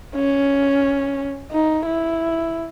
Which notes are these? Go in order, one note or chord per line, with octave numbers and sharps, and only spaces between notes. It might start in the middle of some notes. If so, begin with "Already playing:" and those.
C#4
D#4
E4